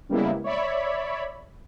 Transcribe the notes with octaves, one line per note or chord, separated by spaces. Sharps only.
C#3 G3 G#3 A#3 B3 E4
C#5 D5 E5 B5